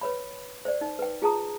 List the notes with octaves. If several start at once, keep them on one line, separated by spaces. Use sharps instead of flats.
B4 C#5 B5
C5 D5
D#4
B4 G5
F4 G#4 A5 A#5 D#6